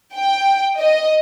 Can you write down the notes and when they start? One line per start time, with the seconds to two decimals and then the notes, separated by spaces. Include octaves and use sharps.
0.15 G5
0.79 D#5